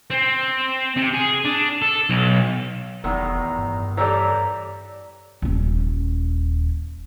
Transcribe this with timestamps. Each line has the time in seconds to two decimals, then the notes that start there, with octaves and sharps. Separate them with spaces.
0.11 C4
0.97 C3
1.13 G#4
1.45 D4
1.82 A4
2.10 B1
3.04 F1 E2 A2 C3 D#3 A#5
3.58 G2
3.97 E3 G3 A3 C#5 D5 A#5
5.42 D#1 C#4